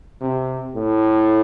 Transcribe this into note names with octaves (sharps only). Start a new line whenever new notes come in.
C3
A2